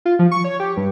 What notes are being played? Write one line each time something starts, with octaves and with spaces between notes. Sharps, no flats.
F4
F3
C#6
C#5
G4
G2